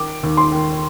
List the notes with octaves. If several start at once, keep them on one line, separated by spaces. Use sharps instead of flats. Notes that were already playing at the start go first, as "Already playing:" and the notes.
Already playing: D#3 D6
D#2
C6
D#3